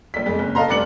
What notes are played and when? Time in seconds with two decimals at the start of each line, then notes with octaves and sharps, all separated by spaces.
0.14 A#1 B6
0.26 F2 G#3
0.39 F#1
0.55 A4 D#5 F5 A#5 C6
0.68 F1 G2 D5 F#6 C#7 F#7